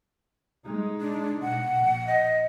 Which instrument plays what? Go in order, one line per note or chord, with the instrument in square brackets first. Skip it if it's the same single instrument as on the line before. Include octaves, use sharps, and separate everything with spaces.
[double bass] G#3 D#4
[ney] D4
[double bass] B2 [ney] F#5
[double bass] A#1
[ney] D#5